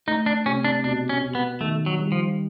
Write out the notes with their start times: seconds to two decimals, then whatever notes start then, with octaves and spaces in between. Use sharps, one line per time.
0.07 A3 D#4
0.26 D4
0.46 C3 C#4
0.65 D4
0.84 B2 D4
1.09 C#4
1.22 B2
1.35 B3
1.60 D#3 A3
1.86 F#3
1.99 G3
2.12 F3